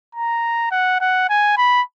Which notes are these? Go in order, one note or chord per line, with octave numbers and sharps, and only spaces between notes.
A#5
F#5
F#5
G#5
B5